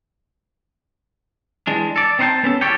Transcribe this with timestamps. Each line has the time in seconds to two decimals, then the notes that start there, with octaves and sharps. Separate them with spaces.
1.67 E3 G#3 D4
1.96 A4 D5
2.19 C4 D#4 C5 F#5 G5 A5
2.44 B3 C#4 A4
2.61 E2 G3 A4 C#5 D5 G5